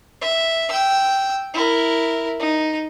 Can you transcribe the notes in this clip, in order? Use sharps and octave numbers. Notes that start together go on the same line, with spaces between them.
E5
G5 E6
E4 A#4
D#4